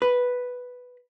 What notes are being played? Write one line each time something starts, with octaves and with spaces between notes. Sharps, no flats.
B4